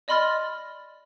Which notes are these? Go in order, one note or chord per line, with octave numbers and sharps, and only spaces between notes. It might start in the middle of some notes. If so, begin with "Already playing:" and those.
D5 D#5 B5 C6 F6 A6